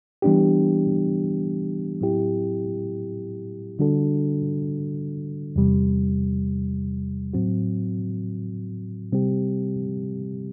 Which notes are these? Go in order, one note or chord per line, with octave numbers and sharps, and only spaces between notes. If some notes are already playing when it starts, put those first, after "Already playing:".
E3 G3 B3 D4 G4
A2 F#3 C4 E4 G4
D3 G3 D4 F#4 A4
E2 C3 G3
A2 F#3 C4 F#4
C3 G3 C4 G4